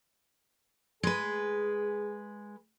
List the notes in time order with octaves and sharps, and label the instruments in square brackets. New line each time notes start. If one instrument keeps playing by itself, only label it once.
[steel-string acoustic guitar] G#3 B4 [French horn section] G#4